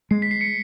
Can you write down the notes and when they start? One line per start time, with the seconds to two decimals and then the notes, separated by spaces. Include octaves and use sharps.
0.11 G#3 C7
0.22 B6
0.31 C7
0.41 C#7